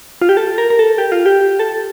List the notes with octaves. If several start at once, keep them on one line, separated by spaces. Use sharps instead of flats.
F4
G4
A4
A#4
A#4
A4
G4
F4
G4
A4